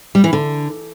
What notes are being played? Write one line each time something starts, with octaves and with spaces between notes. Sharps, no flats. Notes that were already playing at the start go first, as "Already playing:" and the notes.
G3
E3
D3